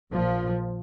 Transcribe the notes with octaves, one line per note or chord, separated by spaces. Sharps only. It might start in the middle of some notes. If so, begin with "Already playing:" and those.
A#1 A#2 F3